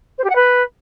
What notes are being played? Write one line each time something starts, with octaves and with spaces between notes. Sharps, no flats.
C5
G4
F#5
B4